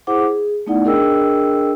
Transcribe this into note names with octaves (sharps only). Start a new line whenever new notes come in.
E4 G#4 C5 F#5 D6
G#4
A3 B3 D#4 E4 D5 F#5
D4 G#4 A#4 D#5 G5 E6